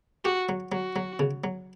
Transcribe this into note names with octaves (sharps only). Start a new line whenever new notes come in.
F#4 G4
F#3
F#3 F#4
F#3
C#3
F#3